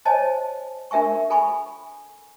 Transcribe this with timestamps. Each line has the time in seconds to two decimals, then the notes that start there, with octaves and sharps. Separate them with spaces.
0.05 C5 C#5 D#5 G#5 A5
0.91 D4 A#4 E5 G#5 C#6
1.30 A4 G#5 B5 C#6